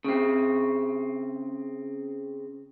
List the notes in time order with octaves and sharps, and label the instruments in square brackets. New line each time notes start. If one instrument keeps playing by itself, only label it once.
[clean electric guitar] C#3 C4